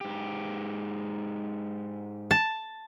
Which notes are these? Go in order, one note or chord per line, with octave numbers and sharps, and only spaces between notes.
G#2 G4
A5